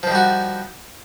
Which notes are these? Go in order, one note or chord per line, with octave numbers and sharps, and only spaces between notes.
D#3 F3 G3 F#4